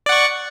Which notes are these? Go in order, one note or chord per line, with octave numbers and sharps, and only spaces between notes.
D5 F#5 C#6